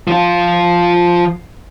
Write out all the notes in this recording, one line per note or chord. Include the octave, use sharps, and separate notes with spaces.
F3 F4